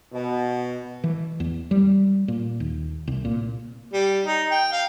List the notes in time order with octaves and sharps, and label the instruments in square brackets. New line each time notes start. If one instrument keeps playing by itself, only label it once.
[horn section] B2
[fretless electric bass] E3
E2
G3
A#2
D#2
C2
A#2
[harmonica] G3
D#4
G5
F5